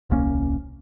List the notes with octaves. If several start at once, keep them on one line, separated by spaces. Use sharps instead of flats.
D#1 C2 A#3 C#4